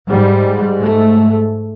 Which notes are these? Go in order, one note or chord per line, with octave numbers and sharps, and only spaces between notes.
G#2 G3
A3